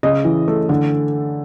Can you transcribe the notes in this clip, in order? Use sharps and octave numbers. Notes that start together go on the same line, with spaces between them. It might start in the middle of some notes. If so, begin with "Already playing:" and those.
C#3 D#5
E3
A3
D3